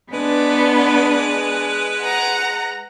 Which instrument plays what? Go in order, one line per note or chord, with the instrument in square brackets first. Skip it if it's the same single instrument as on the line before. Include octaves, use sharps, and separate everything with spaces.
[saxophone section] G#3 B4 [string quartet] B3 D4
[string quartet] F#5 A#5